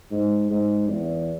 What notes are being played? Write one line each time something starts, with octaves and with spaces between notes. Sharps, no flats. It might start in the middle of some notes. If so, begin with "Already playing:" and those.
G#2
G#2
E2